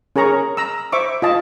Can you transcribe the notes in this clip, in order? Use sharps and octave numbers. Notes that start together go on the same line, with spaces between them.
C#4 G#4 A#4 A#5 C#6
A#5 E6
C5 E5 C#6 D6
F4 D#5 A5